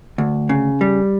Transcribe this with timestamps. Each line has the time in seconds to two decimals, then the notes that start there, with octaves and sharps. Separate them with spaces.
0.18 D2
0.49 C#3
0.81 G3